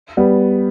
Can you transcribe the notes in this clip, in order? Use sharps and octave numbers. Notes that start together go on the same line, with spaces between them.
G3 B3